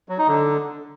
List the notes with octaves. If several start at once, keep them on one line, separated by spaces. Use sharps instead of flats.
F#3
D#4
D3